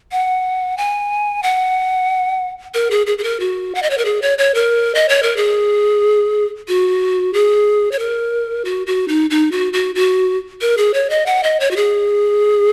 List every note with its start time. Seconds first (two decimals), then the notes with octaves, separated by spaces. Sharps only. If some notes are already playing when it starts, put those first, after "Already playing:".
0.12 F#5
0.78 G#5
1.43 F#5
2.74 A#4
2.91 G#4
3.07 G#4
3.18 G#4
3.23 A#4
3.40 F#4
3.75 F#5
3.83 D#5
3.90 C#5
3.98 A#4
4.05 G#4
4.22 C#5
4.38 C#5
4.54 A#4
4.95 D#5
5.09 C#5
5.23 A#4
5.37 G#4
6.68 F#4
7.33 G#4
7.92 C#5
7.99 A#4
8.65 F#4
8.87 F#4
9.08 D#4
9.30 D#4
9.52 F#4
9.73 F#4
9.95 F#4
10.61 A#4
10.77 G#4
10.94 C#5
11.10 D#5
11.26 F#5
11.43 D#5
11.60 C#5
11.71 F#4
11.76 G#4